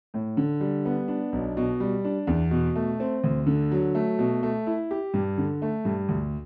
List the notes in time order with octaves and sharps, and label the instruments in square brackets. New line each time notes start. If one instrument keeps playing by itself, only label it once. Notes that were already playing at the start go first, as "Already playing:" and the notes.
[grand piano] A2
D3
G3
B3
D4
B1
B2
G3
D4
E2
B2
A3
C4
D2
D3
F#3
A3
B2
A3
E4
G4
G2
D3
A3
G2
D2